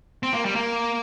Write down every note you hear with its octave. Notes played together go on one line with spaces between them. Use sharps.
C4
A#3
G3
A#3